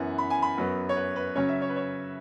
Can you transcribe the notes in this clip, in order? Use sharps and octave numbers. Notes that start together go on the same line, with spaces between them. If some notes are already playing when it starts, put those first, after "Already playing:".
Already playing: F#2 E3 B3 F#5
B5
G#5
B5
F#2 F#3 B3
C#5
B4
B4
C#3 F#3 C#4 C#5
E5
C#5
B4
C#5